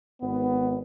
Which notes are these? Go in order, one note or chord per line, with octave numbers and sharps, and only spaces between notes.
G#1 G#2 B3